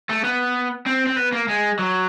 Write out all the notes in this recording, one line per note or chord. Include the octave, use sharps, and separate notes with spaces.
A3
B3
C4
C4
B3
A#3
G#3
F#3